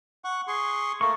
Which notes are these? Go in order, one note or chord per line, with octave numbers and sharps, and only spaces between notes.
F#5 C#6
G#4 C6 C#6
A3 A#3 A4 A#4 C#6